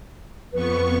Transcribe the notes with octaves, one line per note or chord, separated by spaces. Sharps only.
F2 B3 B4 C#6